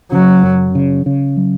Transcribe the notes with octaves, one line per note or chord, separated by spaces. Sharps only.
C#3 F#3
F#2
C#3
C#3
F#3